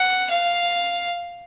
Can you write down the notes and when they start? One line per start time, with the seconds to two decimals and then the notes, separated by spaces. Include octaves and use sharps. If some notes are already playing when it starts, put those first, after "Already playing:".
Already playing: F#5
0.30 F5